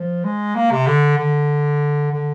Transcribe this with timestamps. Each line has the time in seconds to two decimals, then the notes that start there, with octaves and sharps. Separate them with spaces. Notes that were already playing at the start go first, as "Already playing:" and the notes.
Already playing: F3
0.24 G#3
0.55 A#3
0.71 C3
0.87 D3
1.18 D3
2.12 D3